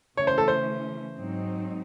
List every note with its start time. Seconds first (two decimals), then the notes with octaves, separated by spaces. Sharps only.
0.17 C#3 E3 A3 C#4 C#5
0.27 C5
0.38 A4
0.48 C5
1.17 G#2 F#3 C4 D#4